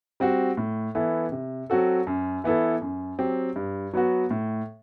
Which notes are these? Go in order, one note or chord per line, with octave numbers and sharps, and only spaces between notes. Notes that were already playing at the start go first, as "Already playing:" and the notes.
G3 C4 F#4
A2
E3 B3 E4 A4
C3
F#3 C4 F#4 A4
F#2
E3 B3 E4 A4
F#2
F#3 C4 G4
G2
F#3 B3 F#4
A2